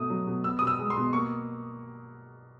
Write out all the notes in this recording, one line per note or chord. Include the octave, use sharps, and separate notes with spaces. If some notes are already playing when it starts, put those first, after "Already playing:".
Already playing: B2 A3 D#6
F#3
B2
B3 E6
B2 D#6
E6
G#3
C6
B2
A#3 C#6